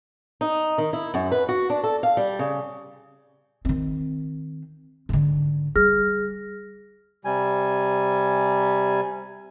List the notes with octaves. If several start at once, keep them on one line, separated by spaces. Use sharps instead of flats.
D#4
D#3
E4
F#2
B4
F#4
D4
A4
F5
G3
C#3
D#3 C4
G#2 D3
G3 G#4 F6 A#6
C3 G3 G#5